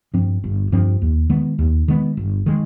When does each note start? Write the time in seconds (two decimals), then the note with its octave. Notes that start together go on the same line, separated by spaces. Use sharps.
0.14 G2 F3 C4
0.44 G1
0.72 G2 F3 C4
1.02 D#2
1.30 D#3 G#3 B3
1.59 D#2
1.88 D#3 G#3 B3
2.17 G1
2.46 D#3 G#3